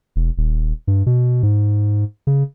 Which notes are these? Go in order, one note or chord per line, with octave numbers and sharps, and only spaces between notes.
E1
D#1
G2
B2
G#2
C#3